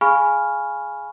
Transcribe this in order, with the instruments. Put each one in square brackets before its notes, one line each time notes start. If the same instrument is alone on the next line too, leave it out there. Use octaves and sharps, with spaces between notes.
[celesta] G#4 F5 G#5 B5 C#6 F6